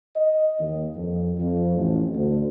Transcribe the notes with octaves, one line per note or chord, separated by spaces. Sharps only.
D#5
D#2
F2
F2
A1
D2